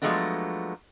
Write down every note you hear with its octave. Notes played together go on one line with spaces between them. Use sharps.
F3 F#3 G#3 A3 B3 D4